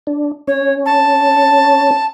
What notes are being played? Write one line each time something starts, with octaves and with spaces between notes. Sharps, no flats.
D4
C#4 C#5
A5